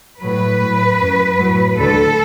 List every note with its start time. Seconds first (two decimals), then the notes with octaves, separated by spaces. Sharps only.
0.21 A2 F#3 B4
0.60 A2 F#3
1.00 F#2 F#3
1.39 A2 F#3
1.78 D2 D3 F#3 A4